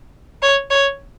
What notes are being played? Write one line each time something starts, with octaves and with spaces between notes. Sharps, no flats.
C#5
C#5